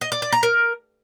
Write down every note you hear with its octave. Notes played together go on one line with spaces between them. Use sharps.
D#5
D5
D5
A#5
A#4